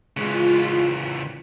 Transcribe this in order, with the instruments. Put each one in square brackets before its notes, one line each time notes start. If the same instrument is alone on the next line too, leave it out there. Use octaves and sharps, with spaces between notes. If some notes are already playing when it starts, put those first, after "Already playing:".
[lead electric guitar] C#3 E3 [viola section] G#3 F4